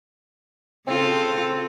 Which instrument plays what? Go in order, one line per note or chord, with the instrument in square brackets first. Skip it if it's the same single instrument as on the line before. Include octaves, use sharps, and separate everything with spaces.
[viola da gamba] C#3 F4 A4 [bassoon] C4